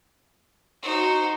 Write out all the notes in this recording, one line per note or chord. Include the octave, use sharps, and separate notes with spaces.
D#4 F#4 C5 C#6